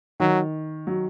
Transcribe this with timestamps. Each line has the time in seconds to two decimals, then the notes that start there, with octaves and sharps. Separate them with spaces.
0.20 D#3 F#3
0.87 F#3